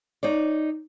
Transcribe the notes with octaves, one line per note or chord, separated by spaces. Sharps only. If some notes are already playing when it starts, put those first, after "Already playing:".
D#4 C#5 D5